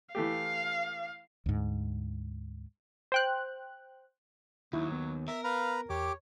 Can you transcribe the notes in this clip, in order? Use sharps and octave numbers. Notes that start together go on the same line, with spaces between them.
E3 A3 G4 F5
D2 G#2
C5 G5 F#6
D#2 F#3 D#4 E4
B3
A#4 E5
B4 F5 A#5
E2 G4 C#5 D6